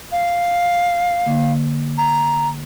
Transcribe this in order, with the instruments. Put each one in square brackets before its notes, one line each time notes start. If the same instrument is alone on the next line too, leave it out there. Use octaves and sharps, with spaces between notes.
[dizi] F5
[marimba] D3 A#3
[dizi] A#5